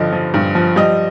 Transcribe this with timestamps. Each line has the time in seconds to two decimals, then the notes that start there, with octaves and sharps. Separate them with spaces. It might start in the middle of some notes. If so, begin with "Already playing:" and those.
Already playing: G2 D3 F3 D#5
0.12 F3
0.34 G2
0.55 F3
0.76 G3 D#5